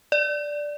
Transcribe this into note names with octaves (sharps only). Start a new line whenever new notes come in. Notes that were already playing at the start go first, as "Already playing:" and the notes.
D5